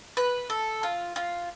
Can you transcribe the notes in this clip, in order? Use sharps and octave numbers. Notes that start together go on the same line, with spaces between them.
B4
A4
F4
F4